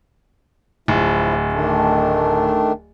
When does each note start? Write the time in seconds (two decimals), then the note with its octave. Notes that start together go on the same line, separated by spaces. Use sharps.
0.88 D1 F3 E4
1.52 D#3 A3 D4